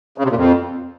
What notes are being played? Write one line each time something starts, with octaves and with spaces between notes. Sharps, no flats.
C#3
C3
A#2
F2